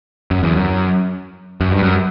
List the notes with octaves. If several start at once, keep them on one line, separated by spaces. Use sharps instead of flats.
F#2
E2
F#2
F#2
G2
F#2